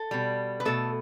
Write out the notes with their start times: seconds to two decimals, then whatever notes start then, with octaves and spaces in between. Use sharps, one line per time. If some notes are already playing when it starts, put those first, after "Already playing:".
Already playing: A4
0.11 B2 G3
0.60 B4
0.65 B2 A3 A4